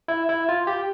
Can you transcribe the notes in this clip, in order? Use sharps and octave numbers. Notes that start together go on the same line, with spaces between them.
E4
E4
F4
G4